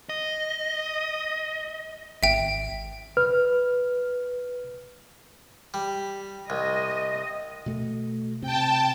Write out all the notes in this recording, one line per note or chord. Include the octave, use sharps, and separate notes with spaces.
D#5
G#1 E5 G5
B4 F6
G3
C2 D#5
B2 A3
C3 G5 A5